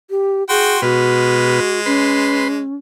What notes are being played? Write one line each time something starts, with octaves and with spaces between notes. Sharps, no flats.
G4
F#4 G#4 G5 C6
B2 G#3 F#4 B4 F6
C#4 B4 C6